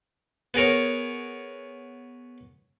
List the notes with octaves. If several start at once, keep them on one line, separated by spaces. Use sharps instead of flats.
B3 G#4 A#4 C#5